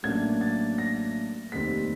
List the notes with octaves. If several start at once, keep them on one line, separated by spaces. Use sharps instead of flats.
A1 A2 F#3 A#3 D4 G#6
A6
A#6
F1 D#2 D#3 G3 C4 B6